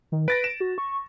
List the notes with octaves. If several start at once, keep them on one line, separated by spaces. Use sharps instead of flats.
D#3
B4 A6 A#6 D7
E7
F#4
C#6